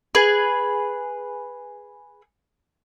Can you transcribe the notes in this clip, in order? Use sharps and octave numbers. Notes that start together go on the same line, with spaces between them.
G#4 B4